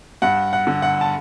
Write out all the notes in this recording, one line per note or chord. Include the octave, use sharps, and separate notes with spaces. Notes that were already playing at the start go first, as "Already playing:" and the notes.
G2 F#5
F#5
D3
F#5
A5